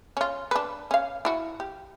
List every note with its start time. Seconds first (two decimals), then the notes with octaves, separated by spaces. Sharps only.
0.17 C#4 F4
0.51 D4 B4
0.91 C#4 F5
1.25 E4 F#4
1.60 G4